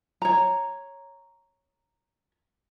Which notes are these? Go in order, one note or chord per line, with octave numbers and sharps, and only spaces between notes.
C#5 A#5